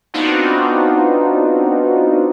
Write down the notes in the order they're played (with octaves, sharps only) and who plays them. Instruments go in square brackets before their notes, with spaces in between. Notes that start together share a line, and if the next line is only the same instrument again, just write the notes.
[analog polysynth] B3 C4 D4 D#4 F4 F#4